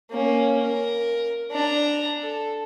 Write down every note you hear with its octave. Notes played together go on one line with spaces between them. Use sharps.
A#3 C#4
A#4
D4 A#5
A4